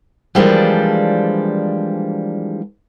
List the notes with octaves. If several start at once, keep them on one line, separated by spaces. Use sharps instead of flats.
E3 F3 G3 G#3 A#3 D4